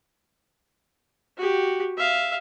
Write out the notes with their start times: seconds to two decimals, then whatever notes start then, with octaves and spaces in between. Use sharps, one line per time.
1.37 F#4 G4
1.97 E5 F5